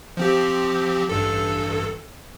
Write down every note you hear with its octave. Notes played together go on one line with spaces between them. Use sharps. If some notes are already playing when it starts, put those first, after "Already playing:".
F3 C4 G4
A1 G2 A4